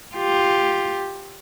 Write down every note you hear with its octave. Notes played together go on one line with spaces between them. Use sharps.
F4 G4